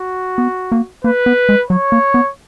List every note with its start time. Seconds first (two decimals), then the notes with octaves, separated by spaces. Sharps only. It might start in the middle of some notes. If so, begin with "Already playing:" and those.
Already playing: F#4
0.38 B3
0.72 A#3
1.04 A#3 B4
1.26 B3
1.49 G#3
1.70 F#3 C#5
1.92 A#3
2.14 B3